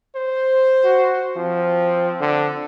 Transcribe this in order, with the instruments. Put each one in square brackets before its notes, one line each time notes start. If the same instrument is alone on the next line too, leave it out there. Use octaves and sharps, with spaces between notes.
[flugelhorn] C5
[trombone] F#4
[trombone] F3 [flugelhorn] C4
[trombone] D3